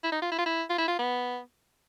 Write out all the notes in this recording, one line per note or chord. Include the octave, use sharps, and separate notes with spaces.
E4
D#4
F4
E4
F4
E4
F4
E4
F4
B3